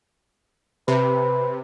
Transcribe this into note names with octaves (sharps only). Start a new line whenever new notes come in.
C3 B4